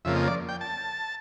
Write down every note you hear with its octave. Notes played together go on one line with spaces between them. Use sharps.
F2 C#3 F3 A#3 E5
D#5
D5
G5
A5